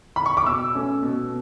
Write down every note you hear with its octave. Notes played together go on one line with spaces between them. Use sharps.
B5
C#6
D6
B2 E6
A3 C#4
B2